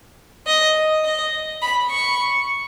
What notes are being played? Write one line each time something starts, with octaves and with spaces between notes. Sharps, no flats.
D#5
D#5
B5
C#6